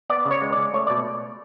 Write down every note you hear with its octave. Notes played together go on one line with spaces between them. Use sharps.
B3 D5
C#3
C#5
G#3
D5
C#3
A3 C#5
B2 D5